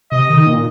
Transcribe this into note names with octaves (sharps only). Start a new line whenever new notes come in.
C3 D#5
D#3
A#2